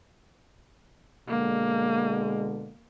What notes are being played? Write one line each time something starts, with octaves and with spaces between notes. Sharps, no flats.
B2 D3 G#3 A#3